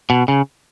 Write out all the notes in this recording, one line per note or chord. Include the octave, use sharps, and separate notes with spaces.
B2
C#3